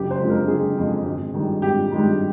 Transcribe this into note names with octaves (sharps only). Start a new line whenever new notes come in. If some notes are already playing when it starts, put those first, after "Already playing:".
Already playing: F#1 G4
C5
F2 D3 F3 G#3
A#4
F#1 G#4
F2 D3 F3 G#3
G#1
G2 D#3 G#3
G#1 G4
G2 D#3 G#3